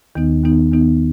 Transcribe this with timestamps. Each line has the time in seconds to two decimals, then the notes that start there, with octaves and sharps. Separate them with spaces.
0.15 D#2 D#3 B3 D#4
0.44 D#2 D#3 B3 D#4
0.72 D#2 D#3 B3 D#4